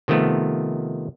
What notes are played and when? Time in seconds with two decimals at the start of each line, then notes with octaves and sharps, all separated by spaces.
0.08 C3 D#3 F3 A3 B3